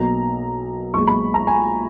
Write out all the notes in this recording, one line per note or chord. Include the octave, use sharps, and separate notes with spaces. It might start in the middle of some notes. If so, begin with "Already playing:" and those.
Already playing: B1 B2 A#3 A#5
B1 A#2 G#3 C#6
B5
A#5
G#5